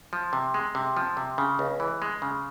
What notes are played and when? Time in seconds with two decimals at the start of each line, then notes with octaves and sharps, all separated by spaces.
0.13 F3
0.33 C3
0.54 G#3
0.75 C3
0.97 F3
1.17 C3
1.38 C#3
1.59 C#2
1.80 E3
2.02 G#3
2.22 C#3